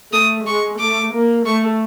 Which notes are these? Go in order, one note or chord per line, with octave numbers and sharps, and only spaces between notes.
A3 D#6
G#3 C#6
A3 D6
A#3
A3 C#6